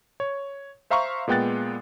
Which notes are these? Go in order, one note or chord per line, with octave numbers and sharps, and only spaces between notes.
C#5
C5 E5 F5 A#5 C6 C#6
A#2 G#3 B3 G5 F#6 A6